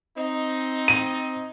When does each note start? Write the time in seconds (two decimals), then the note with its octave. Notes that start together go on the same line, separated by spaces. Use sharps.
0.16 C4 D#4
0.88 D#7